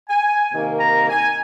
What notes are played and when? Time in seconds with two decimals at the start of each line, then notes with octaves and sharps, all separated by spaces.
0.09 G#5
0.52 C3 D#3 A#3
0.80 A#5
1.10 G#5